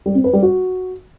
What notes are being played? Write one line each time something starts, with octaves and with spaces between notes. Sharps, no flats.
G3
C4
B4
G3
F#4